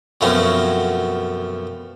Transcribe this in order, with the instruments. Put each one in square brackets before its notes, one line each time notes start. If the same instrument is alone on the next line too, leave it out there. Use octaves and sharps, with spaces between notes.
[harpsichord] F#2 B2 F3 A3 C4 C#4